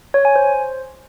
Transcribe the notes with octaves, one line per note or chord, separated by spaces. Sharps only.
C#5
G#5
C5